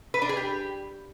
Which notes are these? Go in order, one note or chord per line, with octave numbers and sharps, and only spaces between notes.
B4
D4
G#4
G4